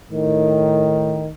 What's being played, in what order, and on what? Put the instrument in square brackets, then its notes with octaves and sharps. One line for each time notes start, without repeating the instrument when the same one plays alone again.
[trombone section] A2 D#3